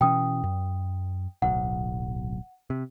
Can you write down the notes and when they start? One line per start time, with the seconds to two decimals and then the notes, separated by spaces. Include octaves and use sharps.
0.01 B2 E3 C#4 G5 D#6
0.43 F#2
1.42 D1 B1 F#5
2.70 C3